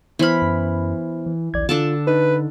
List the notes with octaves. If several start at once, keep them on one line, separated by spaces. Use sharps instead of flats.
E3 B3 C5 B5 F6
F#2
E3
A#1 D#2 D5 G#6
D3 D4 F4 A4 A5
D#4 B4